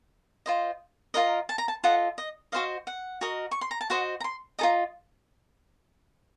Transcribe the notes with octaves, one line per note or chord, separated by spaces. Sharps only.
F4 C5 D#5
F4 A#4 D#5 A#5
A5
A#5
A5
F4 A4 D#5 F#5
D#5
F#4 C5 D#5 F5
F#5
F#4 A#4 D#5
C#6
C6
A#5
A5
F#4 C5 D#5 F#5
A#5
C6
F4 A4 D#5 A#5